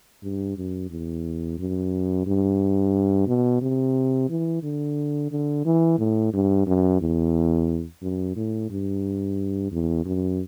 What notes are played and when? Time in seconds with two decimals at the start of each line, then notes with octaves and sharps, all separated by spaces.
0.23 G2
0.57 F#2
0.91 E2
1.59 F#2
2.27 G2
3.28 B2
3.62 C3
4.30 E3
4.63 D3
5.32 D3
5.65 E3
5.99 A2
6.34 G2
6.67 F#2
7.01 E2
8.02 F#2
8.36 A2
8.70 G2
9.72 E2
10.06 F#2